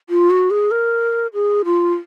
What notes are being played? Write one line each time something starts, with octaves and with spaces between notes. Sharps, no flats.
F4
F#4
G#4
A#4
G#4
F4